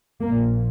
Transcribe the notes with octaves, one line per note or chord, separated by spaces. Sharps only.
A#1 A#2 A#3